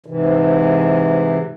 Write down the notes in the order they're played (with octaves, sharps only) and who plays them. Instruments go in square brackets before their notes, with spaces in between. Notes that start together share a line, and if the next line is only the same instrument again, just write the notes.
[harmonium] G#2 C3 E3